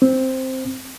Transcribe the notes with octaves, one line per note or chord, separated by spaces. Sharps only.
C4